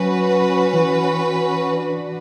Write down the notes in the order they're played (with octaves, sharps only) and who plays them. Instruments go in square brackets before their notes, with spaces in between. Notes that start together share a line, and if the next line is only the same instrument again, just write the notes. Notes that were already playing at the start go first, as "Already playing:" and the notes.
Already playing: [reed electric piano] F#3 [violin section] C#4 F#4 B4
[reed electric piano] E3
[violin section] D4 F#4 B4